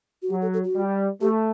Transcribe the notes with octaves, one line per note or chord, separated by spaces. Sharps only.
F#4
F#3 G4
A4
A4
F#4
G3
A3 G4